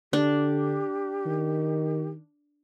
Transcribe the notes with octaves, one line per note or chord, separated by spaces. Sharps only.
D3 D4 G4
D#3